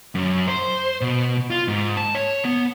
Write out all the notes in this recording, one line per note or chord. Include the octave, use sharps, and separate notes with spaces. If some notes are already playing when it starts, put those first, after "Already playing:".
F#2
C5
B2
F4
G#2
A5
C#5
B3